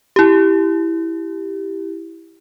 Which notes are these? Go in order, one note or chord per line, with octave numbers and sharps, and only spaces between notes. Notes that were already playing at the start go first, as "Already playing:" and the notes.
E4 G4